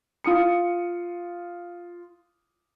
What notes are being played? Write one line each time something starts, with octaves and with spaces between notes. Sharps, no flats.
F4 D#6 C#7